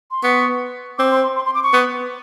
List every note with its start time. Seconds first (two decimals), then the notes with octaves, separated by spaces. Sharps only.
0.11 C6
0.23 B3 C#6
0.98 C4 D6
1.11 C6
1.23 C6
1.36 C6
1.46 C6
1.55 D6
1.63 C#6
1.73 B3